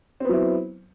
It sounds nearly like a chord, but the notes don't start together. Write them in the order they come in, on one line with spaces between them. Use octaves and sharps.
C4 B3 F#3 E4